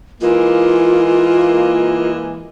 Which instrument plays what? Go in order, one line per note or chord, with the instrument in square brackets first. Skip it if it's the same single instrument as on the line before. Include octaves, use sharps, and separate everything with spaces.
[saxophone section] E3 G#3 A#3 [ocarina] F4